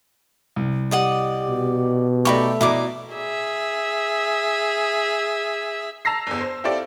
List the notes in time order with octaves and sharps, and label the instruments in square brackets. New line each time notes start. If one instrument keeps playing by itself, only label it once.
[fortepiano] C2
[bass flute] G4 [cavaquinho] D5 D#5 F#5
[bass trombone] B2
[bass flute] A3 [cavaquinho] D#4 E4 G4 [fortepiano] D5 B5 C#6
[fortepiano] B2 A#5 [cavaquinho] E4 D5 D6
[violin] G#4 E5
[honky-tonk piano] A5 A#5 E6 A#6 C7
G1 E2
C5
C4 E4 F4 G4 A4 D5